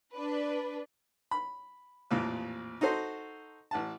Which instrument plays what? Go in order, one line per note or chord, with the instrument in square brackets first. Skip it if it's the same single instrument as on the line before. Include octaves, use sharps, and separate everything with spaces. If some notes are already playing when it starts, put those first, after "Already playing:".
[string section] D4 B4
[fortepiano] B5
A1 F2 A#2
D#4 F#4 A4 C5 C6
A1 F#5 A5